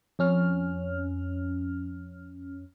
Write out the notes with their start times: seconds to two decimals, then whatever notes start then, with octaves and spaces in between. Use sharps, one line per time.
0.19 F2 C#4 F6